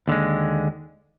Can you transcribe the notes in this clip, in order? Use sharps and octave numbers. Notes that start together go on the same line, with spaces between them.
D#2 D3 G#3